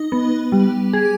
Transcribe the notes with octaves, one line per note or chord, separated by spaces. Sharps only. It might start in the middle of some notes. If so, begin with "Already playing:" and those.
Already playing: D#4
B3
G3
G#4